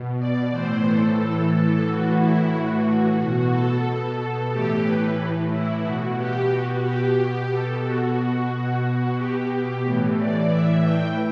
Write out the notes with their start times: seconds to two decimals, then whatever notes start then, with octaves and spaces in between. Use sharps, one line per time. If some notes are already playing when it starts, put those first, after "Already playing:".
Already playing: B2
0.19 D5
0.51 A2 E3 C5
0.85 A4
1.18 A4
1.52 A4
1.85 A2 E3 F#4
2.18 E4
2.52 F#4
3.19 B2
3.51 A4
4.52 A2 E3 G4
4.85 B4
5.51 E4
5.84 B2 F#4
6.18 G4
6.51 F#4
6.84 G4
7.17 B2 G4
7.51 A4
7.84 F#4
8.51 B2
8.83 F#4
9.18 G4
9.84 A2 E3
10.17 D5
10.50 E5
10.83 G5